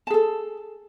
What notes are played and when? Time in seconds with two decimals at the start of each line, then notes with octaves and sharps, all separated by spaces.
0.07 A5
0.10 G#4
0.14 A4